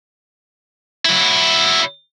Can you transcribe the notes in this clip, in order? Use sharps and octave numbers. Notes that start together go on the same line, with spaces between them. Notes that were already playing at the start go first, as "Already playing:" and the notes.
F#3 E4